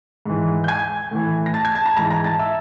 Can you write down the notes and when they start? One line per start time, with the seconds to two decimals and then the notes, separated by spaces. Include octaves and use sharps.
0.25 G#2 E3
0.64 G6
0.68 G#5 G#6
1.11 A2 E3
1.46 A#6
1.54 A5 A6
1.65 G#6
1.75 A5 A6
1.86 A#5 A#6
1.96 G#2 E3 A#5 A#6
2.11 A#5 A#6
2.24 A5 A6
2.39 E5 E6